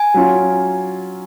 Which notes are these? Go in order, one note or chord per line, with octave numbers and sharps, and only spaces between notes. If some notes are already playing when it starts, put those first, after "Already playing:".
Already playing: G#5
F#3 C#4 F4